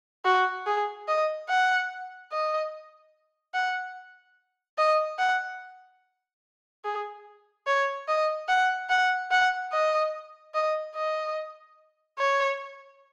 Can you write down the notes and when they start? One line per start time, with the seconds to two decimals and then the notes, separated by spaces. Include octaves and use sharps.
0.25 F#4
0.66 G#4
1.08 D#5
1.49 F#5
2.32 D#5
3.54 F#5
4.78 D#5
5.19 F#5
6.84 G#4
7.66 C#5
8.08 D#5
8.48 F#5
8.90 F#5
9.31 F#5
9.72 D#5
10.54 D#5
10.95 D#5
12.19 C#5